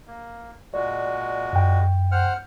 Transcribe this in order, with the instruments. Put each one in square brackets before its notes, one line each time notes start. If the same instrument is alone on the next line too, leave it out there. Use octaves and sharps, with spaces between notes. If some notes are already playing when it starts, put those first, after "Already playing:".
[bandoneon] A#3
[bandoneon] A#2 G#3 F#4 [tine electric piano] D5
[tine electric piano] F#2 G5
[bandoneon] C5 F#5 F6